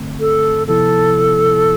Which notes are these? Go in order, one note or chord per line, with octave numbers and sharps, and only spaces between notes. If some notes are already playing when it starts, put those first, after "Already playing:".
Already playing: G2 D3 A3 C4
A4
C3 F3 B3 E4 A4